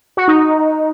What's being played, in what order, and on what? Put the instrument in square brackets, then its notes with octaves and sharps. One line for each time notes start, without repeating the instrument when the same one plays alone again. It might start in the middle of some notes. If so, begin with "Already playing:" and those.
[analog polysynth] F#4
D#4